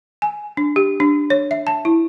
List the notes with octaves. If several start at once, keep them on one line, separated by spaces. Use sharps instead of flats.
G#5
D4
G4
D4
C#5
E5
A5
E4